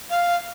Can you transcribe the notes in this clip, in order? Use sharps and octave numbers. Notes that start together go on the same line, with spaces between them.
F5